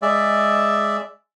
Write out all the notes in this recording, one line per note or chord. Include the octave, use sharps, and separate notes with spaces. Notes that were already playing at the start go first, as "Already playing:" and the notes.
G#3 D5 E5